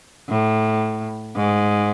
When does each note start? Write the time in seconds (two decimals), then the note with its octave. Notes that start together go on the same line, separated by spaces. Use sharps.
0.28 A2
1.35 G#2